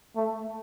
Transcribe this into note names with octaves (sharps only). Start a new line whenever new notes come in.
A3